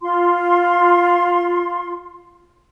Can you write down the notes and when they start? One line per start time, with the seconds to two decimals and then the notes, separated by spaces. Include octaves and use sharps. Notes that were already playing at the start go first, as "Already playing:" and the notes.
0.01 F4 C6